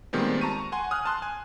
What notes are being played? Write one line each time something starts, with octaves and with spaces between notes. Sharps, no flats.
A#2 D#3 G3 G#3 B3 C4
A5 A#5 C#6 D#7
F#5 G#5 C6
G#5 D#6 F6 F#6
A5 C6 F#6
G#5